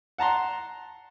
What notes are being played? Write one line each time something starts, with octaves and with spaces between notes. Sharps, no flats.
F#5 A5 A#5 C6